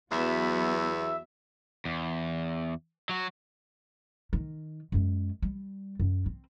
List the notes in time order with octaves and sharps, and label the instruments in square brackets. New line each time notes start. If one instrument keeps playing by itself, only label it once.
[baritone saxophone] E2 [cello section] F#3 B3 F#4 [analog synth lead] E5
[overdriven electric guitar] E2
F#3 F#4
[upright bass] D#3
F#2 G#3
G3
F#2
C4